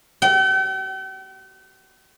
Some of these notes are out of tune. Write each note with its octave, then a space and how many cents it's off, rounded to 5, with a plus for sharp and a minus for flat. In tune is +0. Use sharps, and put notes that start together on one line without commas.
G5 -45